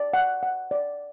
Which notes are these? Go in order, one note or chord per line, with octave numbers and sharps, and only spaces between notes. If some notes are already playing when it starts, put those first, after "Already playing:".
Already playing: D5
F#5
F#5
D5